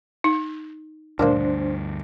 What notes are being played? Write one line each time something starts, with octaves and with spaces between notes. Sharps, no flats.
D#4
D2 G2 A#2 D#3 A#3 D4 C5